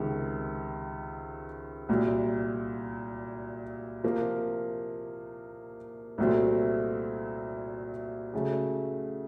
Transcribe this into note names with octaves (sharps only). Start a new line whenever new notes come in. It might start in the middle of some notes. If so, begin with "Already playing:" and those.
Already playing: C#2 C3 D#3
C2 A#2 F#3
C3 F3 A#3
C2 A#2 F#3 A3 C4
C#3 F#3 A3